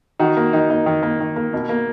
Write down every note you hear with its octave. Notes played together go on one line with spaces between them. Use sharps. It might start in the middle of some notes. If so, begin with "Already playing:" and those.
D#3 D#4 F#4
A#3
D#3 D#4
A#3 D#4
D#3
A#3
D#3
A#3
B2
A#3